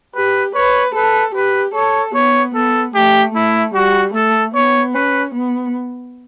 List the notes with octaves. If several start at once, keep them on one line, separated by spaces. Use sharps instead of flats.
G4 B4
B4 C#5
A4 B4
G4 B4
A4 C#5
B3 C#5
B3 A4
A3 G4
A3 E4
G3 F#4
A3 A4
B3 C#5
C#4 B4
B3